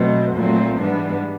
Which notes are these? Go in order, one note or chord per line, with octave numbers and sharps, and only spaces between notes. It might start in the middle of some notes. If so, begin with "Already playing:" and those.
Already playing: B2 F#3 A3 C4
A#2 F#3 A3 C4
G#2 E3 G3 B3 D4